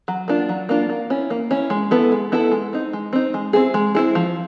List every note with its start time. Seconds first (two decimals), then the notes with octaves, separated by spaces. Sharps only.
0.08 F#3
0.28 A#3 D4 F4
0.49 F#3
0.69 A#3 D4 F4
0.90 A#3
1.10 C#4 E4
1.30 A#3
1.51 C#4 E4
1.70 G#3
1.91 B3 E4 A4
2.12 G#3
2.32 B3 E4 A4
2.52 G#3
2.73 C4 D#4
2.93 G#3
3.13 C4 D#4
3.34 G#3
3.53 C4 E4 G#4
3.74 G#3
3.95 C4 E4 G#4
4.15 F3